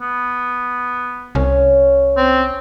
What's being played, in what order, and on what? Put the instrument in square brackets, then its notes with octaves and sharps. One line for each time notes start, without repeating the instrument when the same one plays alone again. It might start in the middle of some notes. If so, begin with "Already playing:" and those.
[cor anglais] B3
[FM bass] C2 [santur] C#4
[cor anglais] C4